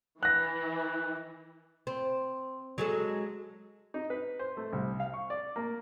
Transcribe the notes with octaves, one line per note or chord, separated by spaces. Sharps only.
E3 F#6 A#6
C4
F#3 G#3 A4
D#4
B4
C5
A3
C2
F5
C#6
D5
A#3